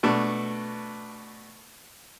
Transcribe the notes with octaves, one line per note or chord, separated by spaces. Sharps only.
B2 A3 D4